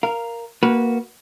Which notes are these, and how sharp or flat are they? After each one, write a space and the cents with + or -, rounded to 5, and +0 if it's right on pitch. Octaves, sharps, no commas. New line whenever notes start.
A#4 +0 F5 -10
A#3 +0 F#4 +0 B4 -15